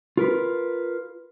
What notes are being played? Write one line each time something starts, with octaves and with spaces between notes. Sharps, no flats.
F4 A#4 B4